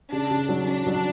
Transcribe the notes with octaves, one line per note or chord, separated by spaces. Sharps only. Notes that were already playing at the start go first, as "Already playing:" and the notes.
C#3 D4
C#3
F#3
C#4 D4
F#3